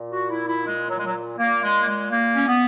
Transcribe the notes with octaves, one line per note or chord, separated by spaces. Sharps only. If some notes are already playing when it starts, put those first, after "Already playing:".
Already playing: A#2
F#4
E4
E4
G#3
F#3
G#3
F#3
A#2 A#3
G#3
A#3
G#3
A#3
C#4
B3